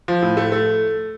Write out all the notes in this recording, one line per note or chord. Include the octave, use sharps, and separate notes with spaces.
F3
A2
A3
A3